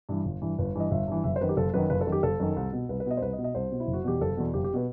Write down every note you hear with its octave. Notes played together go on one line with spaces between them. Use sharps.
G2 E3
G1
G2 E3
G1 B4
G2 E3 D#5
G1 E5
G2 E3
F#1 E5
C5
F#2 D#3 B4
G4
F#1 A4
F#2 D#3 B4
F#1 B4
A4
F#2 D#3
G4
F#1 A4
F#2 D#3
C2
B2
C2 B4
B4
B2 D#5
C5
C2 B4
D#5
B2
D#5
C2 C5
B2
E4
F#1
F#4
E2 B2 G4
F#1 A4
E2 B2
F#1 G4
G4
B2 B4